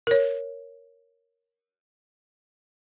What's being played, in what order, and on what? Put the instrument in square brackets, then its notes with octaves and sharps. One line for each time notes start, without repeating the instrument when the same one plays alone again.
[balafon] A#4 C#5